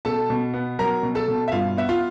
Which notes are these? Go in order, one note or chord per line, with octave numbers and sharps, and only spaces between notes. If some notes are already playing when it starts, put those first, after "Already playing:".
B2 A4 A5
B2
B3
F#3 A#4 A#5
B2
A4 A5
B2
E5
G2 F4 F5
B3 E5
F4 F5